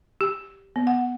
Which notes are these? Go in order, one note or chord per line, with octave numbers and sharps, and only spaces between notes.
G4
B3
F#5